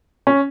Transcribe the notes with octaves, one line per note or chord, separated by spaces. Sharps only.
C#4